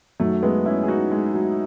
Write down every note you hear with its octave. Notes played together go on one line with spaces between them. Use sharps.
F#2 D#3 F#3 A3
G#3 B3
C#4 E4
G#4
D#4 F#4
G#3
F#3